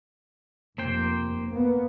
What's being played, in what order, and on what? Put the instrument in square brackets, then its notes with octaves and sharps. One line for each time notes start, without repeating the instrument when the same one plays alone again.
[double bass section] F1 [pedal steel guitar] A#3 C5 G5
[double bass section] A#3 B3